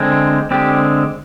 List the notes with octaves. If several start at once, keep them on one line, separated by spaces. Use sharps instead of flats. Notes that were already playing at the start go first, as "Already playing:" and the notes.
Already playing: D3 G#3 C4
D3 G#3 C4 G4